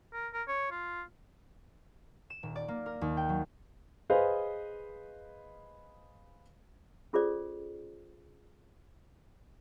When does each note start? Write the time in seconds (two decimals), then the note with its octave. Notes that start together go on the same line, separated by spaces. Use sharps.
0.13 A#4
0.33 A#4
0.48 C#5
0.71 F4
2.30 E7
2.43 D#1
2.56 D5
2.68 A#3
2.86 A#4
3.01 D#2
3.17 G5
3.29 F#3
4.10 G#4 B4 C5 D#5 F5
7.13 C#4 F4 G#4 A4 C5 D5